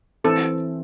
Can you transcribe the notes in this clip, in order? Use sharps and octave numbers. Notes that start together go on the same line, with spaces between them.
E3 C4 A4